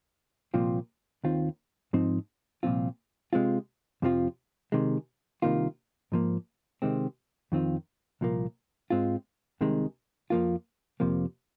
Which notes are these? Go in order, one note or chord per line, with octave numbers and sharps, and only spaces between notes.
C2 A#2 F3 C4 F4
D#2 D#3 C4 F4
G#2 F3 C4 D#4
C2 A#2 F3 C4 F4
C3 G#3 C4 F4
F2 C3 F3 C4 F4
C3 D#3 G#3
C2 C3 D#3 A#3 F4
G#2 F3 A#3
C3 D#3 G#3 C4
F2 D#3 C4 F4
C2 A#2 F3 A#3
G#2 G#3 C4 F4
C2 C3 D#3 G#3
F2 F3 A#3 F4
F2 C3 F3 A#3